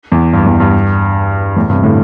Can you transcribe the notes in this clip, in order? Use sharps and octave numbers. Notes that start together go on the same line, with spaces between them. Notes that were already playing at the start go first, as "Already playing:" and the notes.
E2
G2
E2
G2
E2 A2
G2 C3
A2 D3